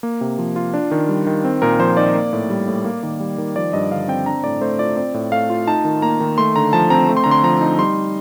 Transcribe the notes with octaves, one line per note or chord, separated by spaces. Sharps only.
A#3
C3
F3
F4
D4
D#3
G3
D#3
C4
A#2 A#4
F3 C5
D#4 D5
A#3
A2
G3
A2
A#3
D#3
G3
D#3
F3 D5
G2 D#5
D3 F5
C4 G5
D4 A#5
A2 D5
A3 C5
F4 D5
C4 D5
A2
A3 F5
F4
D#4 A5
D#3
A#3 A#5
D#3
A3 C6
D3 A#5
F3 A5
C4 A#5
A3
C6
D3 A#5
C6
F3 A#5
D#4
G3 C6